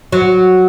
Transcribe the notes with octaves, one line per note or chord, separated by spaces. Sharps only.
F#3